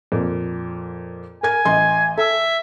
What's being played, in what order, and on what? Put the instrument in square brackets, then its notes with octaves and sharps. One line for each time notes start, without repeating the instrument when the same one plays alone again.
[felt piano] F2 A#2
[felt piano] A#4 G#6 [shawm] G#5
[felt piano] A1 D#5 C6
[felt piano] A4 [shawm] E5